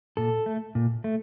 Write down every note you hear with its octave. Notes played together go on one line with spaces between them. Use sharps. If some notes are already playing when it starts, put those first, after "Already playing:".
A#2 A4
A3
A#2
A3